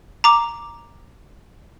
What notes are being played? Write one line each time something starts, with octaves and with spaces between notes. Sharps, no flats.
A#5 D6